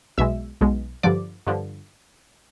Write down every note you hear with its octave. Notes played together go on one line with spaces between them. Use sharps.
B1 B2 G#3 E5 E6
B1 B2 G#3
G2 D3 F3 D5 D6
G2 D3 F3